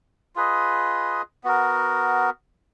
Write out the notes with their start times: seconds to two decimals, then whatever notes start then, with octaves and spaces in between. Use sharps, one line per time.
0.36 F4 G#4 B4 D#5
1.44 B3 F#4 A#4